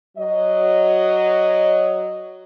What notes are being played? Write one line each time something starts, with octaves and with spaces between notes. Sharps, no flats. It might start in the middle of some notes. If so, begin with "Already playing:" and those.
F#3 D#5